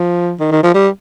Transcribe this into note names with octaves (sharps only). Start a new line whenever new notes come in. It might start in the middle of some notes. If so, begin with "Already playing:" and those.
Already playing: F3
D#3
D#3
F3
G3